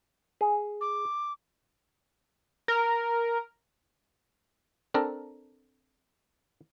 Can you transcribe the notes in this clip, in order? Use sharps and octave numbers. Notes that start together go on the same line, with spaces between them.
G#4
D6
A#4
C4 D4 A4 A#4